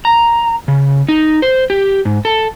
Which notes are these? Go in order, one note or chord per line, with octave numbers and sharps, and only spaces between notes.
A#5
C#3
D#4
C5
G4
G#2
A4